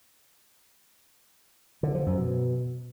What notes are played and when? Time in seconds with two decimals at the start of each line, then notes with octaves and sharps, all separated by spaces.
1.83 D3
1.95 F3
2.06 F#2
2.18 B2